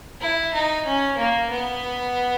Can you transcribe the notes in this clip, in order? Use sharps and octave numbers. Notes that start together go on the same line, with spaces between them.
E4
D#4
C#4
A#3
B3